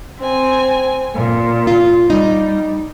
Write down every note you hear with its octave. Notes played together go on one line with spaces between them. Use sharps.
C4 G#5
A#2
F4
G3 D#4